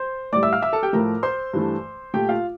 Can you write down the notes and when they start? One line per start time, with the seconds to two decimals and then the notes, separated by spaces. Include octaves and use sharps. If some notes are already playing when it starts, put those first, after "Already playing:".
Already playing: C5 C6
0.33 A2 G3 D5 D6
0.43 E5 E6
0.52 F5 F6
0.62 E5 E6
0.73 A4 A5
0.83 G4 G5
0.93 A2 F3 A3 A#4 A#5
1.23 C5 C6
1.53 G2 E3 A3
2.14 A#2 A3 G4 G5
2.29 F4 F5